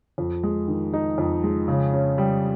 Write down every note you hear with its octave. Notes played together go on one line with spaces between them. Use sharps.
F2
G#3
D#3
D#4
F2
G#3
C#3
C#4
G3